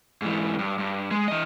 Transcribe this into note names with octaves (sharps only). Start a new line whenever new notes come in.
G#2 E3
G2
G2
G#3
E3 D#5